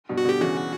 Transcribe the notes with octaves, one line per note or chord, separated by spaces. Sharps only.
G2 B2
F#4
B2 D3
G4
C#3 E3 F#4